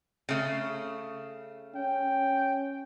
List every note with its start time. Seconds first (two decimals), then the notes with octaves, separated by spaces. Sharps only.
0.29 C#3 A3
1.75 C#4 G5